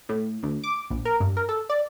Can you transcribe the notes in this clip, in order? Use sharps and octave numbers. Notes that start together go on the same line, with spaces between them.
A2
D2
D6
A#1
A#4
G2
A#4
A4
D5